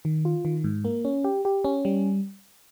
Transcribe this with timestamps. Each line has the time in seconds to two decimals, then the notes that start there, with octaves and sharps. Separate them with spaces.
0.05 D#3
0.25 F4
0.45 D#3
0.64 G#2
0.85 A#3
1.05 C#4
1.24 G4
1.45 G4
1.64 C#4
1.85 G3